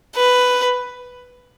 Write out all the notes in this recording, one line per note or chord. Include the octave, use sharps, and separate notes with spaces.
B4